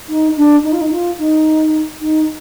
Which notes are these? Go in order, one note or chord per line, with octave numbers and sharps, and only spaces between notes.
D#4
D4
D#4
F4
D#4
F4
D#4
D#4